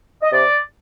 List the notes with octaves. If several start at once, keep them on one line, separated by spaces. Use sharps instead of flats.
D#5
C3 D5